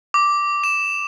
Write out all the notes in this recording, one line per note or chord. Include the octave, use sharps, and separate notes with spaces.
D6
E7